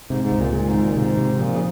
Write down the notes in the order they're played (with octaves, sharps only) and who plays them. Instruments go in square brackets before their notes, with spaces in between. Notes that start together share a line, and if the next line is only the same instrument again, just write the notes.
[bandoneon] G#2 [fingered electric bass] C3
[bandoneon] G#2
[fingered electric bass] C#2
[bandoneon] A#2
[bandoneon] A#2 [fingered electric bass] G#3
[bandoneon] G#2
[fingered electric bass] D#3
[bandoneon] A#2
[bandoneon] G#2 [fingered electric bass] C3
[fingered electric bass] C3
[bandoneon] A#2 [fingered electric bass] F3
[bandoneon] C#3